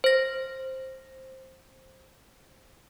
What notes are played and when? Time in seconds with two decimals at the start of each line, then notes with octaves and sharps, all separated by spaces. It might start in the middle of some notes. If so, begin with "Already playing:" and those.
0.04 C5 A#6